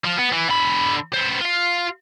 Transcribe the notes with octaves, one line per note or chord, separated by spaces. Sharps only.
F3
B3
E3
D3 B5
B3 C5
F4 F5